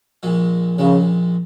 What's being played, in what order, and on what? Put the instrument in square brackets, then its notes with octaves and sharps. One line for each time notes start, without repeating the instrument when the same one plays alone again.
[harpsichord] A#1 A#2 G#3
[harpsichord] A#1 A#2 G#3 [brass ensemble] C#3